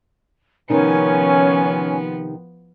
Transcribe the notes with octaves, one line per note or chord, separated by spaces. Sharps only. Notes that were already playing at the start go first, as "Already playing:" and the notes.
C3 D#3 F3 B3 C#4 D#4 G#5